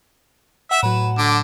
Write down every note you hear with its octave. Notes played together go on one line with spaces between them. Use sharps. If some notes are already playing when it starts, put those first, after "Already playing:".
E5 F#5 E7
A2 F#3 B4
D3 D6